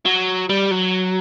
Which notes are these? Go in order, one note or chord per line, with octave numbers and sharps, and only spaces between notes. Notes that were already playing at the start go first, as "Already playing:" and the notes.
F#3
G3
F#3